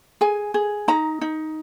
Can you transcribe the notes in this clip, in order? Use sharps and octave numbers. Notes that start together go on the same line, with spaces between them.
G#4 G#5
G#4
D#4 A#5
D#4